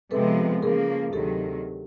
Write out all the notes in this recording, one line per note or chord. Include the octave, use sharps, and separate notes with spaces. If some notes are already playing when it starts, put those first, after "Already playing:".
C3 F3 G#3 B3 A4 B4
C#3 F3 A#3 G#4 A#4
D2 C3 D#3 F#3 G4 A4